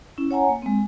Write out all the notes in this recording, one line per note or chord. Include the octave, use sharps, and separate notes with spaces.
C#4 E4
C#5 F#5 G#5 A#5
A#3
G#3 C4